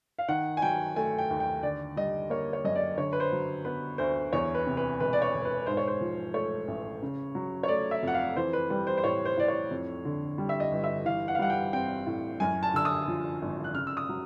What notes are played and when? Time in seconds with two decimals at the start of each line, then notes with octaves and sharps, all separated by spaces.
0.19 F5
0.28 D#3 F#5
0.57 G#5
0.62 F#3 G5
0.96 A3 G#5
1.19 G5
1.30 D#2
1.40 G5
1.63 D3 D5
1.96 G3 D#5
2.30 A#3 C#5
2.53 C#5
2.64 F#2 D#5
2.76 D5
2.97 D3 C#5
3.13 B4
3.20 C5
3.32 F#3
3.65 B3 B4
3.98 D2 C5
4.33 E2 C#5
4.55 B4
4.66 C3
4.77 B4
5.00 E1 B4
5.13 D5
5.22 C#5
5.34 E1
5.45 B4
5.66 G#2 C5
5.77 C#5
5.87 C5
6.01 F3
6.34 A3 C#5
6.68 A1
7.02 C#3
7.35 F#3
7.63 C#5
7.68 A3 D5
7.91 E5
8.03 F2 F#5
8.14 F5
8.36 E3 C5
8.53 B4
8.70 G3 B4
8.87 C5
8.98 C5
9.04 A2 C#5
9.25 C5
9.37 A2 D5
9.48 C#5
9.71 F2
10.05 D3
10.38 G3
10.49 E5
10.60 D#5
10.72 G1
10.84 E5
11.05 E3 F5
11.28 F#5
11.35 F5
11.39 G3 F#5
11.50 G5
11.73 C4 G5
12.07 A2
12.40 F#2 G#5
12.63 A5
12.74 D3 E6
12.85 D#6
13.08 F3
13.42 G#1
13.64 F#6
13.74 C#3 F6
13.87 E6
13.97 D#6
14.09 F#3